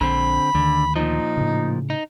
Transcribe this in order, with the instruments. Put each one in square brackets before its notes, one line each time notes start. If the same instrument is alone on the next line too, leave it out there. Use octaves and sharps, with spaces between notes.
[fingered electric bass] A#1 [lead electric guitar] D3 C4 [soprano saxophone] B5
[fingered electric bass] D2 D#3 [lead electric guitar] D3
[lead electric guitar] A#2 F3 [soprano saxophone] D#4
[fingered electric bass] A2 C#3
[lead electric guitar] D#4